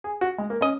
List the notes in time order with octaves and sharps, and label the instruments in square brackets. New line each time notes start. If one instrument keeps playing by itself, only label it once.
[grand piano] G#4
F#4
G#3
A#3
[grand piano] C#4 [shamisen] D#5